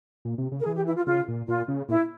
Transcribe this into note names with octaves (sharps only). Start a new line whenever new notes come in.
A#2
C3
C#3
A#4
E3 G#4
G4
E4
F4
C#3 F4
A#2
A#2 F4
C#3
A#2 E4